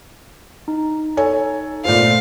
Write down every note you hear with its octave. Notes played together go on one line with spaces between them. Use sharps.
D#4 A#5
A4 C#5 G#5
A#2 A3 F4 A4 C5 F5